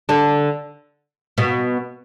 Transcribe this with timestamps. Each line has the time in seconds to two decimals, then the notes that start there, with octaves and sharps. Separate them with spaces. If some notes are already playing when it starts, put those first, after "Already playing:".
0.09 D3 D4
1.38 B2 B3